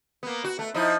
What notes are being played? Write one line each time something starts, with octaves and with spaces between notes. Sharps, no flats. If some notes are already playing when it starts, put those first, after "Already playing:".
A#3 B3
F#4
A3
F3 D#4 E4